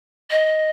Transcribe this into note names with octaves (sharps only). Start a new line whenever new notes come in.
D#5